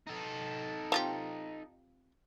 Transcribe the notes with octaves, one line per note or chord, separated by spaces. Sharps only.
D#4 A4
C4 F4 G4